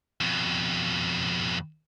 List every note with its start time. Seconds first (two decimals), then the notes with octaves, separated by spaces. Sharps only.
0.21 F2 B2